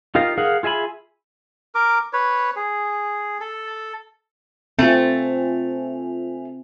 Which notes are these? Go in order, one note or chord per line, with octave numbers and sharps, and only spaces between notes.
D#4 F4 G4 A#4 F5
G#4 A#4 F5 F#5
F4 G#4 E5 G#5 B5
A#4 D6
B4 C#5
G#4
A4
A3 C4 F4 E5 G#5